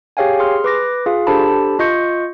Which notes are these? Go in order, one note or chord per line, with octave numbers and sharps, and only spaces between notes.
G4 G#4 C#5 F5 G5 G#5
G#4 C6 F6
B4 D6 A#6
F4 G#4 F5
D4 G4 A4 C5 A5 B5
F4 D#5 C#6 G6 C#7